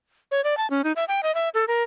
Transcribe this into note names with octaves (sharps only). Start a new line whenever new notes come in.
C#5
D5
A5
C#4
D#4
E5
G5
D#5
E5
A4
A#4